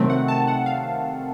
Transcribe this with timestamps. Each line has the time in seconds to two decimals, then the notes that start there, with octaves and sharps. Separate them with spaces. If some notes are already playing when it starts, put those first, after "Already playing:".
Already playing: C3 D#3 F#3 A3 C4
0.10 F#5
0.28 A5
0.47 F#5
0.66 F5